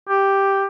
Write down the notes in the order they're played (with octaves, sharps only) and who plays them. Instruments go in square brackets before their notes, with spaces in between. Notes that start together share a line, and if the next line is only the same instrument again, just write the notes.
[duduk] G4